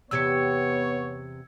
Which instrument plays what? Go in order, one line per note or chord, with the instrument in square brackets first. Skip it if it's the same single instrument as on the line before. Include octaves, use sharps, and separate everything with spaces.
[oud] E2 C3 G4 [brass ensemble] B3 C#5 [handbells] E6 G#6 C#7